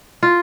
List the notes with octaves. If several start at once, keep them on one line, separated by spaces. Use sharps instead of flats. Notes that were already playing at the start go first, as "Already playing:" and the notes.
F4